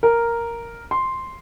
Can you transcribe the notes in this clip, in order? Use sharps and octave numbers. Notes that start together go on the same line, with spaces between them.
A#4
C6